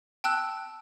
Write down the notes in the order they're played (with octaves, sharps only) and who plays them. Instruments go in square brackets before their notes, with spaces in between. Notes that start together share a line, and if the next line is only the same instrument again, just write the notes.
[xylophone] G5 A5 E6 F#6